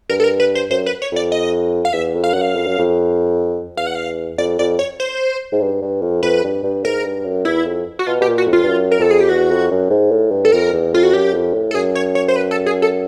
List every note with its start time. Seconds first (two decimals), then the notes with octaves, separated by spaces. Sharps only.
0.10 G2 A#4
0.20 A4
0.24 A#4
0.40 B4
0.55 C5
0.70 F#2 C5
0.86 B4
1.02 C#5
1.12 F2 D5
1.32 D#5
1.85 F5
1.93 E2 E5
2.14 F2
2.24 F5
2.33 F#2 F#5
2.41 F5
2.55 F2
2.67 F#2
2.78 F2
3.77 E2 F5
3.87 F#5
3.95 F5
4.38 F2 D5
4.59 F2 D5
4.79 C#5
5.00 C5
5.52 G#2
5.61 G2
5.82 G2
6.02 F2
6.23 F2 B4
6.44 G2
6.63 G2
6.83 G#2 A#4
7.05 G2
7.25 F#2
7.45 E2 E4
7.66 F2
7.99 F#4
8.07 B2 F4
8.21 B2 G4
8.28 A#2
8.38 F#4
8.48 F2
8.53 F4
8.63 G2
8.68 F#2
8.91 A#4
8.99 F2 A4
9.11 G#4
9.20 G4
9.29 E2 F#4
9.50 F2
9.71 F#2
9.90 G#2
10.12 A2
10.31 G2
10.45 A4
10.52 F2 A#4
10.73 E2
10.93 F2 F4
11.03 F#4
11.13 F#2 G4
11.34 F2
11.54 A2
11.71 A4
11.75 F#2 G#4
11.95 C#5
12.15 C#5
12.28 C5
12.36 B4
12.51 A4
12.66 G#4
12.82 A4